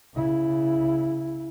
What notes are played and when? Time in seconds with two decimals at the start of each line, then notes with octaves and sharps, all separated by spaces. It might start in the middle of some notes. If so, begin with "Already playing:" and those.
0.15 C#3 E4